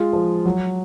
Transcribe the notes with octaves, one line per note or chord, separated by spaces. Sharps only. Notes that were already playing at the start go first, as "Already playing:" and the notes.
Already playing: G#3 F4
F3
F#3